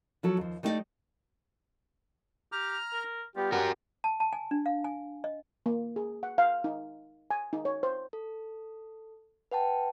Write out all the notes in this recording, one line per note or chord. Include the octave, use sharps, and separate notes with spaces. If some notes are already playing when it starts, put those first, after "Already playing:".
F3 F#3 A4
D#2 F3
G3 A3 D#4 F4 D5 D#5
G4 A#5 F6
A#4
G3 B3 F4 G4
F#4 G4 A#4 F#5
A5
A5
G#5
D4
F5
G#5
D#5
A#3
G#4
F#5
F5
D#4
G#5
D#4
C#5
C5
A4
B4 F#5 G5 A5